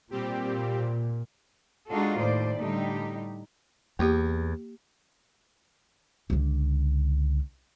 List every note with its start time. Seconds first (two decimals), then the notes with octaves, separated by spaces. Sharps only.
0.11 A#2 G3 C4 G4
1.89 G#3 D4 D#4 F4 F#4 A4
2.19 D#2 A2 C5 D5
2.60 A2 D3 G3 D#4 G4
3.99 E2 A#3 G4
6.30 C#2 D3